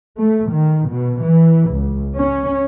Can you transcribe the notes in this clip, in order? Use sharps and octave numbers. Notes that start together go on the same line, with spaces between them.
A3
D#3
B2
E3
C#2
C#4